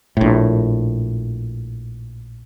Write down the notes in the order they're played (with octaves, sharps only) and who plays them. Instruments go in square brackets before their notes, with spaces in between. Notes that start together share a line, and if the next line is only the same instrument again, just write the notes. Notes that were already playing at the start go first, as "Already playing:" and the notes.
[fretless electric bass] A#1 A2